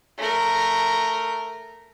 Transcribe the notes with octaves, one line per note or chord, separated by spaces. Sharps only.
A3 A#4